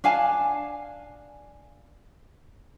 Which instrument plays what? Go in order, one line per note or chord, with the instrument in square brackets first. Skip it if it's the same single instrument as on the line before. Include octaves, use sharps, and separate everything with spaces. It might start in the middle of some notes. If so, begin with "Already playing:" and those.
[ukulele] D4 F5 G#5 A5